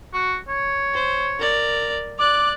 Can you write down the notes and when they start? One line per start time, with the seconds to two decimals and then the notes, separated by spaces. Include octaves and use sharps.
0.13 F#4
0.48 C#5
0.94 C5
1.39 A#4 D5
2.19 D5 D6 F#6